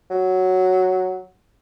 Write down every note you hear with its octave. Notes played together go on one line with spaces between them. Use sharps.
F#3